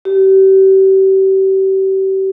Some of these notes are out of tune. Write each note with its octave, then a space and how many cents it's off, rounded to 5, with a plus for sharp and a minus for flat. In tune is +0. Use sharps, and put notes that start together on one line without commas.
G4 -35